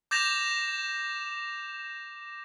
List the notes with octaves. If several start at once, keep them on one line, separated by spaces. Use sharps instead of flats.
D6 G6 A6 A#6 E7 F7